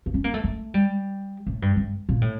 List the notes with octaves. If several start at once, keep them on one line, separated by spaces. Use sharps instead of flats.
A#3
C#4
A#3
A3
A3
G3
A2
G2
G2
A#2
A2